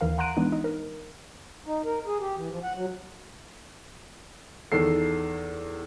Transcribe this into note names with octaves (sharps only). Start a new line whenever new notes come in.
D#2 E3 A#4 F5
F#5 A#5 C6 F#6 D7 D#7
E3 G#3 B3 D4 D#4
D#4
A#4
D#4
A#4
G#4
G4
E3
F3
F#5
F#3
E2 D#3 A4 C7